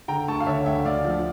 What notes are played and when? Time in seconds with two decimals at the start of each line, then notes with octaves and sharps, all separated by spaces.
0.08 D3 G5 A#5
0.28 D2 A5 C#6
0.40 F5
0.46 D3 C#5 E5
0.66 D2 E5 G5
0.85 D2 D5 F5
1.05 F3